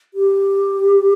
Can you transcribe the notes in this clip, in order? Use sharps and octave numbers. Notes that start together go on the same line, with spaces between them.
G4